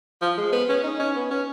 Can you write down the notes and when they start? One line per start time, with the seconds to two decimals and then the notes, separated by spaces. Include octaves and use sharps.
0.22 F3
0.38 G#3
0.53 B3
0.69 C#4
0.84 D#4
1.00 C#4
1.16 B3
1.31 C#4